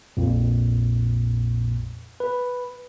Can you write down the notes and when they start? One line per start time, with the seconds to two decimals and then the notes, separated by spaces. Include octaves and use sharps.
0.17 A#1 F2 A#2
2.20 B4